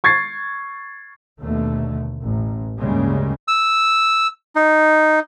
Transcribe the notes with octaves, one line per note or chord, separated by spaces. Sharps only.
C#6 G#6 A6 C7
D#2 B2 D3 A3
A1
D2 G2 C#3 G3 G#3 A#3
E6
D#4